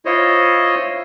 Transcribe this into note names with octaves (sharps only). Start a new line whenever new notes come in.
E4 F4 C5 C#5 D#5